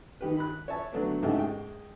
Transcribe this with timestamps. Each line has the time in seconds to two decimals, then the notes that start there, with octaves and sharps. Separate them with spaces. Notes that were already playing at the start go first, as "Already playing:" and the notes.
0.21 D#3 G4 B4
0.37 B5 F#6
0.68 C#5 E5 A5
0.92 D3 F#3 A3 B3 D4
1.22 C#2 G#2 A3 E4 G4
1.38 G#3 G5